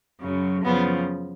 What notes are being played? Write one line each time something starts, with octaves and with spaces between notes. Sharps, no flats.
F#2 C#3 F#3
F#2 C#3 F3 B3